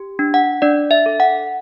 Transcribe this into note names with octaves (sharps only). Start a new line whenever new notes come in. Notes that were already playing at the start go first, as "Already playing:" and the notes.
Already playing: G4
D4
F#5
D4 D5
E5
A4
F#5